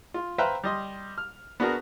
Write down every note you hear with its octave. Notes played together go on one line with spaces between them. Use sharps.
F4
B4 C5 E5 F5 G5 A#5
G3 D#5 C6
F6
B3 D4 F#4 G#4 A#4